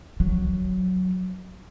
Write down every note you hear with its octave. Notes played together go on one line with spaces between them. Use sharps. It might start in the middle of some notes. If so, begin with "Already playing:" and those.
F#3